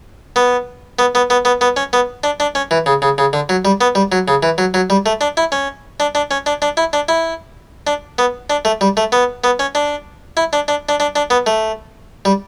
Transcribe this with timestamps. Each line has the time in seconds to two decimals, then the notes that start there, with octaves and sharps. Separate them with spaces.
0.36 B3
0.99 B3
1.15 B3
1.30 B3
1.45 B3
1.61 B3
1.76 C#4
1.93 B3
2.24 D4
2.40 D4
2.55 C#4
2.71 E3
2.86 C#3
3.02 C#3
3.18 C#3
3.33 D3
3.49 F#3
3.65 G3
3.81 B3
3.95 G3
4.12 F#3
4.28 C#3
4.43 E3
4.58 F#3
4.74 F#3
4.90 G3
5.06 A3
5.21 D4
5.37 E4
5.52 C#4
6.00 D4
6.15 D4
6.31 C#4
6.46 D4
6.62 D4
6.77 E4
6.93 D4
7.09 E4
7.87 D4
8.18 B3
8.50 D4
8.65 A3
8.81 G3
8.97 A3
9.12 B3
9.44 B3
9.59 C#4
9.75 D4
10.37 E4
10.53 D4
10.68 D4
10.89 D4
11.00 D4
11.16 D4
11.30 B3
11.46 A3
12.25 G3